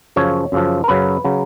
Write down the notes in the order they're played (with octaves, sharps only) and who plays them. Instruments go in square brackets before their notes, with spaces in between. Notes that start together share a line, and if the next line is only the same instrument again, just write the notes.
[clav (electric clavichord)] F#2 C#3 F3 C#5
F#2 C#3 F3
A#4
F#2 C#3 F#3 B4
C#3 F#3